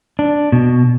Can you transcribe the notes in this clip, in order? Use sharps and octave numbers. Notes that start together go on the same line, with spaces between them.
D4
B2